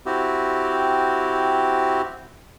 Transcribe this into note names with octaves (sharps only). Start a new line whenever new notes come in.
C4 E4 F#4 G4